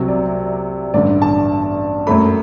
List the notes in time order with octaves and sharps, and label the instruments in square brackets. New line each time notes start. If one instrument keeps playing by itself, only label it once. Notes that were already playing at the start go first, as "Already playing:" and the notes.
Already playing: [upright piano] C2 C3 F#3
D5
A1 G2 D3 D5
A5
F#2 F#3 A3 B5